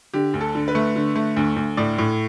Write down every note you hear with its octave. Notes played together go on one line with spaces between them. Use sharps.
D3 G4
D2
A4
D3
B4
A3
D3
A3
D2
D2
A2 D5
A2